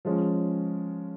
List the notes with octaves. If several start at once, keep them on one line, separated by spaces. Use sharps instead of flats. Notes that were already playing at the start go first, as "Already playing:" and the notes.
F3 G#3 C#4